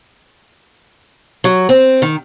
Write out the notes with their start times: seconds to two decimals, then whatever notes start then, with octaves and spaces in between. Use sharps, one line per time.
1.44 F#3
1.69 C4
2.02 D#3